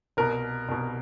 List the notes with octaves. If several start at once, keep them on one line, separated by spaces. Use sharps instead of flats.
C2 B2 A#4
C2 B2